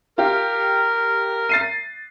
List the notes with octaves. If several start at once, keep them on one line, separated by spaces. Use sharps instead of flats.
F4 G4 A#4
A6 C7 D#7